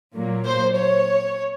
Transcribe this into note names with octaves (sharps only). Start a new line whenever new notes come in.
A#2 F#3 A#3
C5
C#5